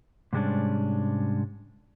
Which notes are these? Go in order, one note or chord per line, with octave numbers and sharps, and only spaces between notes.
G#2 C3 G3 G#3 C#4 D4